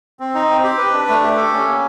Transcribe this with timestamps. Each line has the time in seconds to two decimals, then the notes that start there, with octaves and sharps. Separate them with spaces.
0.20 C4
0.35 D#4
0.49 C4
0.64 G4
0.78 B4
0.93 D4
1.08 A3
1.23 G4
1.37 A4
1.53 C#4
1.67 A#3